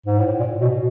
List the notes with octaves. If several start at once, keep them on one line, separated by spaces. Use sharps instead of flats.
G#2
A2
A#2
B2